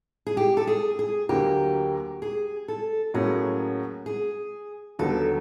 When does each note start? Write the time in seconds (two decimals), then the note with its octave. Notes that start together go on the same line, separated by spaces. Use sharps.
0.27 G#4
0.37 G4
0.57 A4
0.67 G#4
0.99 G#4
1.29 D2 D3 F#3 A#3 G4
2.22 G#4
2.68 A4
3.14 A2 F#3 A#3 C#4 F#4 G#4
4.06 G#4
4.99 D#2 D3 F#3 B3 A4